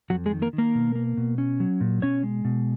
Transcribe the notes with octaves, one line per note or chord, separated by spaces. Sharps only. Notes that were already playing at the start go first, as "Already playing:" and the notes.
F2 F#3 F#4
G#3 G#4
D#3
A#3 A#4
D#3
A#3 A#4
B2
A#3
B2
C#4
F#3
A#2
B2 C#4 C#5
G#3
B2